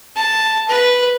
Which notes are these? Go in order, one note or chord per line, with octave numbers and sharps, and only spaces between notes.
A5
B4